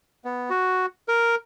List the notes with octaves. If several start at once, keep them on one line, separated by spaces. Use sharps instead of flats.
B3
F#4
A#4